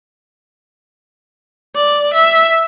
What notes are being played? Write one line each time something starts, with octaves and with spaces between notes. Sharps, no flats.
D5
E5